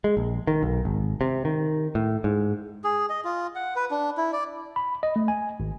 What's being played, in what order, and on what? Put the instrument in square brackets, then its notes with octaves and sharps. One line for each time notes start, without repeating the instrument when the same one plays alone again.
[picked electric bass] G#3
A#1
D#3
B1
G#1
C3
D#3
A2
G#2
[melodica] G#4
D#5
F4
F#5
B4
D4
E4
D5
[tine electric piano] B5
D#5
A3
G#5
G#1